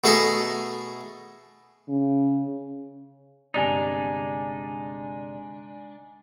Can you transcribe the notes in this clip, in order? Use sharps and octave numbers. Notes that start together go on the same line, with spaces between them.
B2 A3 G#4 A4 G#5 A#5
C#3
G1 C3 G#3 D4 D#4 D5 G#5 F7